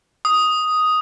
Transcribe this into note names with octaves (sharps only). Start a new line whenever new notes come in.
D#6